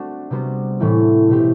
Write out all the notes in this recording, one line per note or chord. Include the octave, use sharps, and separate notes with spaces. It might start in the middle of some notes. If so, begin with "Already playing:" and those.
Already playing: A3 C4 D4 F#4 A4
C3 G3 B3 F#4 C5
A2 E3 A3 C4 E4
B2 A3 E4 G4 C5